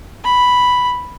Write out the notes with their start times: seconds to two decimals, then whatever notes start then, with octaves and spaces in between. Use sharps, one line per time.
0.24 B5